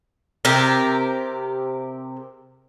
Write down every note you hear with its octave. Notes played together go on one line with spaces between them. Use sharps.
C3 G4 A#4